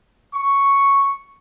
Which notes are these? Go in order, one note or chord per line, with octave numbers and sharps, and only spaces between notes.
C#6